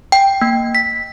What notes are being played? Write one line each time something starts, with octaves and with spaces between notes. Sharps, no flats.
G5
A#3
B6